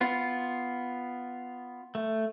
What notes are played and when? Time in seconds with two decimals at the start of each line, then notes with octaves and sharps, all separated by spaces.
0.01 B3 F4
1.95 A3